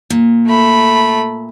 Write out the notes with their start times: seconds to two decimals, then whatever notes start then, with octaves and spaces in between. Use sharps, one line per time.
0.10 A#2
0.47 A3 B5